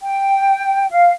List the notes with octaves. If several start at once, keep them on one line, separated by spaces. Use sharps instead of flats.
G5
F5